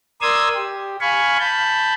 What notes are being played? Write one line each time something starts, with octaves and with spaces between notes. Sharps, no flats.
A#4 D5 C6 D#6 E6 G#6
G4
F5 G#5 B5 C#6
A5 B5 G6